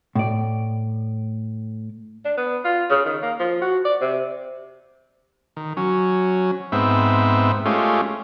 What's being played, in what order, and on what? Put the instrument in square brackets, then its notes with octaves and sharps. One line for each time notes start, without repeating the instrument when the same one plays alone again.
[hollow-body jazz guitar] A2 D5
[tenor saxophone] D4
B3
F4
C#3
D#3
A#3
F3
F#4
D5
C3
[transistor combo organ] D#3
F#3 C#4
G#2 B3 C4 E5
G#3 A3 C#4 F4 G4